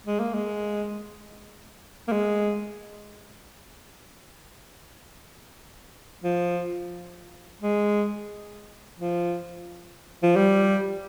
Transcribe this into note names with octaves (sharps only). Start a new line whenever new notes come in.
G#3
A#3
G#3
A#3
G#3
F3
G#3
F3
F3
G3